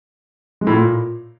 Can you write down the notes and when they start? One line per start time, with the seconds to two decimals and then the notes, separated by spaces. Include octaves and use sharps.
0.61 G#3
0.67 A2
0.72 A#2